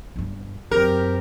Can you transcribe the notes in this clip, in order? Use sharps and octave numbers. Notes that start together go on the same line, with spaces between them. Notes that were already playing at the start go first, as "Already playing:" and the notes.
G1 G2
F#2 C4 G4 A#4